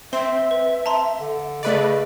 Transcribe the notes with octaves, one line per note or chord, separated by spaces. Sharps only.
C4 E5 C6
B4
A5 A#5 C6
D3
C#3 A3 B4 D5 D#5